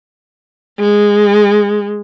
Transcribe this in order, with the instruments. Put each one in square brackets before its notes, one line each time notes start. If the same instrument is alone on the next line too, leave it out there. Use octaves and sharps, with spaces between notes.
[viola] G#3